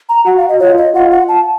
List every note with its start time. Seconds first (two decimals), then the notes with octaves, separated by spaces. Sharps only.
0.09 A#5
0.26 F#4 F#5
0.37 F5
0.49 D#5
0.60 F4 C#5
0.78 D#5
0.94 F4 F#5
1.11 F#5
1.28 A5